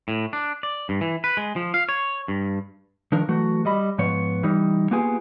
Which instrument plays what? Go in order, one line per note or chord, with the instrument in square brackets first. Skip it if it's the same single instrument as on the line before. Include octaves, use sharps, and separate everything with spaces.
[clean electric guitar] A2
D4
D5
G2
E3
B4
G#3
F3
F5
C#5
G2
D#3 F3 D4 A#4
E3 F#3 A3 F#4
G3 D#5 B5
G#2 F3 B3 C#5
E3 G3 D#4
A#3 B3 F4 G4 G#4 G#5